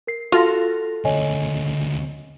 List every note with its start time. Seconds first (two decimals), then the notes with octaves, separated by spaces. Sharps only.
0.07 A#4 C7
0.32 F4 F#4 A4 A#6 F7
1.05 D2 C#3 C#5 D#5 G#5